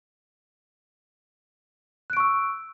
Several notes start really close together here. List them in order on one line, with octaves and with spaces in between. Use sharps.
F#6 D7 C#6 E6